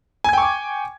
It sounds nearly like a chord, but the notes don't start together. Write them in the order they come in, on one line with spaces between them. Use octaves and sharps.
G#5 G#6 G5 C#6 D6